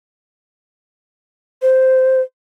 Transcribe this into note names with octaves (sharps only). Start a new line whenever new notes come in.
C5